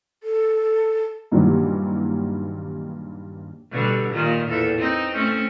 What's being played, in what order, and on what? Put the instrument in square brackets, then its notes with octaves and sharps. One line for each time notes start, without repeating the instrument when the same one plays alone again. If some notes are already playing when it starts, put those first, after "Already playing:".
[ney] A4
[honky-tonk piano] G2 A#2 D#3 E3 F#3 G3
[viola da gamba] B2 D3 G3
A#2 D#3 F4
E2 A#2 A4
C4 D#4
A3 C4 C#4